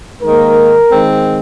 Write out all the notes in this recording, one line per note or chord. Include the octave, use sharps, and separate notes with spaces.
G#2 D#3 A#3 A#4
D#3 G#3 C4